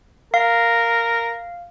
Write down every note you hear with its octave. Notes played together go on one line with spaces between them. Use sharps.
A#4 F5